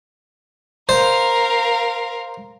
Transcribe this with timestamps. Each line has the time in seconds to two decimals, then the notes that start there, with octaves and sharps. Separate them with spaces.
0.89 A#4 C5 F5